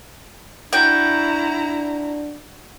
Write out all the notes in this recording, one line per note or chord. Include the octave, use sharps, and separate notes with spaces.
D4 E4 F#4 G5 A#5